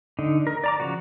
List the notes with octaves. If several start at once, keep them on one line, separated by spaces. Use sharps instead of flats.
D3 D#4
A#4
D5 A#5 D6
C#3 F3 F#4